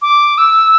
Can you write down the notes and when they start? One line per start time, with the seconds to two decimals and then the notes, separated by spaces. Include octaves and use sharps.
0.02 D6
0.38 E6